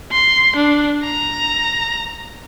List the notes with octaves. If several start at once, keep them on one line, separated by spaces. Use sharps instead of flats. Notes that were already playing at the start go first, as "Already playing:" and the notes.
C6
D4
A#5